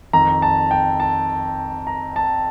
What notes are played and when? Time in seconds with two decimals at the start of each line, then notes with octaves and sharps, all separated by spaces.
0.13 F2 D#3 A#5
0.42 A5
0.71 G5
1.00 A5
1.87 A#5
2.16 A5